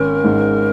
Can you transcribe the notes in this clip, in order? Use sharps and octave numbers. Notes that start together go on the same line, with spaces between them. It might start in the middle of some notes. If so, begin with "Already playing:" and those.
Already playing: G#1 C#4 A#4
G#2